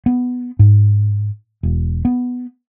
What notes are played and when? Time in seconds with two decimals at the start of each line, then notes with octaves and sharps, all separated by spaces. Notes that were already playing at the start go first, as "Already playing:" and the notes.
0.06 B3
0.59 G#2
1.63 E1
2.05 B3